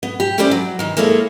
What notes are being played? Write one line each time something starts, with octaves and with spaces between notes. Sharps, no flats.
B3
G4
C#4 E4 G4 B4 C5 D5
F#3
D#3 E3
G#3 A#3 E4 A4 C#5